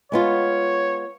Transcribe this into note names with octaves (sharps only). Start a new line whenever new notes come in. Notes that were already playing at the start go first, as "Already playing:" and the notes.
G#3 B3 F4 C#5